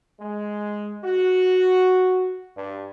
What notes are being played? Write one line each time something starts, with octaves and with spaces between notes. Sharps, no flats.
G#3
F#4
G2